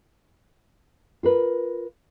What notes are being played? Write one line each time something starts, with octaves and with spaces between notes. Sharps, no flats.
F4 A#4 B4